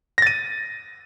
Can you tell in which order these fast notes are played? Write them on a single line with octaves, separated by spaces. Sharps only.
A#6 A6 D#7